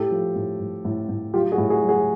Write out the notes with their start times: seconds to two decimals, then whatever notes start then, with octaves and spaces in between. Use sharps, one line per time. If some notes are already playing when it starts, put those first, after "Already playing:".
Already playing: A2 G4 A4
0.11 F3
0.36 A2
0.60 A2
0.85 A2
1.09 A2
1.34 F#3 F4 G4
1.52 F#4 G#4
1.58 A2
1.70 F#4 G#4
1.82 F#3
1.89 F#4 G#4